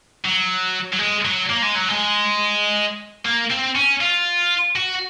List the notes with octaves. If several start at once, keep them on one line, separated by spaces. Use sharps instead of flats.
F#3
F#3
G#3
F#3
A#3
G#3
F#3
G#3
A#3
C4
C#4
F4
F#4